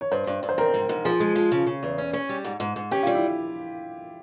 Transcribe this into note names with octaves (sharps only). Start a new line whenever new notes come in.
C#5
G2 C5
G2
G2
C5
C4 A#4
G#2
G#2
F3 G#4
G#3
F3
C#3
C#3
E2
C#4
C#4
G3
G#2
G#2
G#2
C#4 G4
G3 F4
E4